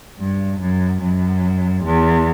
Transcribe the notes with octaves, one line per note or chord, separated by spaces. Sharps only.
G2
F#2
F#2
E2